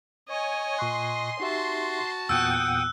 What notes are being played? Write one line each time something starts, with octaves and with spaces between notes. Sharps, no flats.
C#5 D#5 G#5
A#2 C6 C#6 F#6
D#4 F#4 G4 E5 A5
E2 A#2 B3 F#5 G5 D#6 E6 F#6